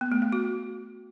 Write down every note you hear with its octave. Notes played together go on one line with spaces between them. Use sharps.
B3
A3
A3
F#4